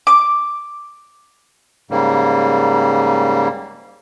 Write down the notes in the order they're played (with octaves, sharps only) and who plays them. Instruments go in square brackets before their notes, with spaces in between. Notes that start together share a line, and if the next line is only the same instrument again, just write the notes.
[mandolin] D6
[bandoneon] G#2 C#3 G3 A#3